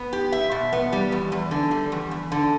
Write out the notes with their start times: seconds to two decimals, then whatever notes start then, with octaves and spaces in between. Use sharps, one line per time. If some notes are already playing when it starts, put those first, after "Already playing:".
Already playing: B3
0.13 G4
0.32 E5
0.51 B2
0.73 B3
0.92 G3
1.12 E2
1.32 E2
1.51 D3
1.71 G3
1.92 E2
2.11 E2
2.32 D3